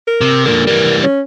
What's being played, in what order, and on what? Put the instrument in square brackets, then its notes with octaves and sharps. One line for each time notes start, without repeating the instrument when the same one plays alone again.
[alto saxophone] A#4
[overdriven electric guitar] C3
[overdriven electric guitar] A#2 D3 [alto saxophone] A#4
[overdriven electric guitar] E3 G3 [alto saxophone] A#4
[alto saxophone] C#4